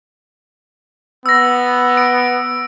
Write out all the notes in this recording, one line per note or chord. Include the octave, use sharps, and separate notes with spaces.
B3 E6 A#6
D7